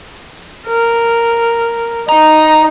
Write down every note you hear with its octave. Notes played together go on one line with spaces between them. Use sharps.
A#4
D#4 A#5